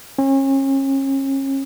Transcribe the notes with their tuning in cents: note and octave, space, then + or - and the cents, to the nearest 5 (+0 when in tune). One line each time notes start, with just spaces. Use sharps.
C#4 -35